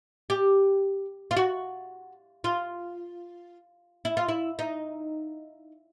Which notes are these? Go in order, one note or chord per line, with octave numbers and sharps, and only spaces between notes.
G4
F4
F#4
F4
E4
F4
E4
D#4